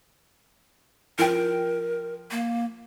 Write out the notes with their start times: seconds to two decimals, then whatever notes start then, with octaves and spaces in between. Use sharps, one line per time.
1.19 F3 A#4 G5
2.31 A#3